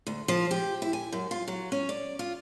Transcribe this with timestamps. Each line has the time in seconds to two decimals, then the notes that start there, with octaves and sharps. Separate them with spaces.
0.07 D2
0.28 F3
0.51 G4
0.82 E4
0.93 G#5
1.12 F#2
1.31 F4
1.48 F#3
1.72 C#4
1.89 D5
2.19 F4